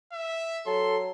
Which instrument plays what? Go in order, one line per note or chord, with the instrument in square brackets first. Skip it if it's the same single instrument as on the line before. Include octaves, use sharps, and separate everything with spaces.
[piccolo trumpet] E5
[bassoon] F#3 [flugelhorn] A4 [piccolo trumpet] C6